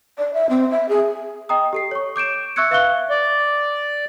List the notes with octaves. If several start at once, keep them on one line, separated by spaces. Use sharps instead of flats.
D5
E5
C4
E5
G#4
D#5 G5 A#5 D#6
G4 A4 C7
C#5 C#6
D6 G6 D7 E7
E5 C#6 E6 F#6 G#6 C#7
B4 E5 F5 C#6 F#6 G7
D5